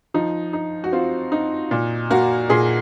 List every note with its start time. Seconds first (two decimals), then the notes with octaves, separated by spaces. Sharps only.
0.14 F3 D#4
0.53 D#4
0.84 F#4
0.92 C4 F4
1.32 D#4
1.71 A#2
2.10 A#3 F#4
2.50 A#2 G#4